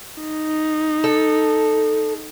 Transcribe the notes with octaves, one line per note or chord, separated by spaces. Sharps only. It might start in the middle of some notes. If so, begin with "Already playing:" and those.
D#4
A4